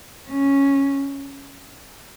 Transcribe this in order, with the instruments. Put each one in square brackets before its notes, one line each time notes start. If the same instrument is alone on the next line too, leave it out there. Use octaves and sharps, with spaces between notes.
[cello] C#4